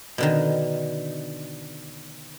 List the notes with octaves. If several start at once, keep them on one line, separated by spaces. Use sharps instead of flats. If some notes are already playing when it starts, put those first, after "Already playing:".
B2 D3 D#3